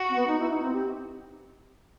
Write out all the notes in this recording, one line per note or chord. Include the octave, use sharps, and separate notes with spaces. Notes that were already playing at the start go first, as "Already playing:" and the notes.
Already playing: F#4
C4
B3
D#4
E4
D#4
C4
G4